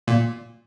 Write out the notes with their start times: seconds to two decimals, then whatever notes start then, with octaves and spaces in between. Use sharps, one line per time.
0.08 A#2